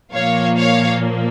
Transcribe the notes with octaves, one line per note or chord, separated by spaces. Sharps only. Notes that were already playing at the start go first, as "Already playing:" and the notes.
A#2 F3 A#3 C#5 F5
C#5 F5